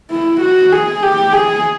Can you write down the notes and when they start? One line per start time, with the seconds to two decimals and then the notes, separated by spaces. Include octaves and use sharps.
0.11 E4
0.41 F#4
0.72 G#4
1.03 G4
1.32 G#4